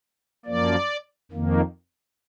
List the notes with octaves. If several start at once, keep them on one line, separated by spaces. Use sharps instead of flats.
F#2 F3 A#3 D5
F2 D#3 A#3